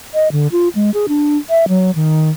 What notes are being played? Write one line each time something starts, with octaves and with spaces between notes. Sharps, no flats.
D#5
D3
F4
G#3
G#4
D4
E5
F#3
D#3